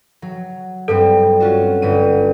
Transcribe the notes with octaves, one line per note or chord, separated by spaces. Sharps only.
F#3
G2 G3 C4 A4
C#4 F4 F#4
G1 D#7